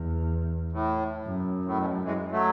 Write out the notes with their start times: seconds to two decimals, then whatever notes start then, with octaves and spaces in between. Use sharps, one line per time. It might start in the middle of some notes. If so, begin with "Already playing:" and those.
Already playing: E2
0.72 A2
1.26 F#2
1.65 A2
1.78 B2
2.04 E3 G#3
2.31 F#3 A3